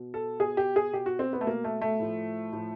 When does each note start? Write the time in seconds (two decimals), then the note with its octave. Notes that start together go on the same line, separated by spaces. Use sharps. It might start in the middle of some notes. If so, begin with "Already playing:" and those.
Already playing: B2
0.14 A4
0.40 B2 G#4
0.57 G4
0.76 G#4
0.93 B2 G4
1.06 F#4
1.19 C4
1.33 B3
1.41 A3
1.47 B2 A#3
1.64 A3
1.81 A3
1.99 A2 F3
2.52 A2 F3